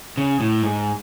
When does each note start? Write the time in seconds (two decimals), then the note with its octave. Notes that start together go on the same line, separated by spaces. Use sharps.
0.17 C#3
0.40 A2
0.63 G#2